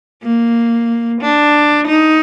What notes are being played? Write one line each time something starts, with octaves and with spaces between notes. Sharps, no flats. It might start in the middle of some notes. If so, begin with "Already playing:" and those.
A#3
D4
D#4